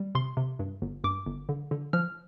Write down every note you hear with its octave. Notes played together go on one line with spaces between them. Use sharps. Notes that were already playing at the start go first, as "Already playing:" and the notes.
Already playing: G3
C3 C6
C3
G2
G1
G2 D6
G1
D3
D3
F3 F6